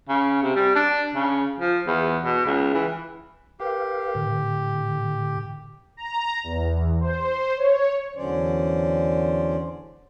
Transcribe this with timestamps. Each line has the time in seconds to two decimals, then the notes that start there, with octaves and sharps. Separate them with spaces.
0.09 C#3
0.43 C3
0.56 G3
0.75 D4
1.15 C#3
1.60 F3
1.87 E2
2.24 B2
2.46 C#2
2.74 E3
3.60 G4 A#4 B4 F5
4.15 A2 D3
5.97 A#5
6.44 E2
7.01 C5
7.57 C#5
8.16 E2 D3 F#3 C#4 C5 D5